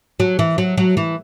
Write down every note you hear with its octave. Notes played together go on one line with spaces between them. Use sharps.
F#3
E3
F#3
F#3
E3